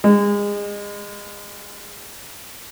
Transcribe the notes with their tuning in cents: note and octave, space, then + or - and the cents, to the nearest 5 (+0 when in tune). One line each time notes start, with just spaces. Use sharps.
G#3 -30